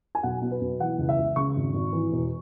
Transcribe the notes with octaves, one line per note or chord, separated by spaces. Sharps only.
G#5
B1 F#5
B2
B4
B1
E3 F#5
C#2
E5
C#2
C#3 C#6
G#1
G#1
E3
E1